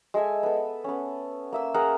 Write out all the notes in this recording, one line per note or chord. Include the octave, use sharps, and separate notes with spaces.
G#3 A4 E5 G#5
B3 A4
B3 C#4
A#3 E5 E6
G#4 A#4 F#5 A#5